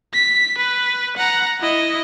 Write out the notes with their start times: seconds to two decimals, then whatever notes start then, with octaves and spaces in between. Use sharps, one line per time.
0.13 B6
0.58 B4
1.17 F#5 A#5
1.60 E4 D#5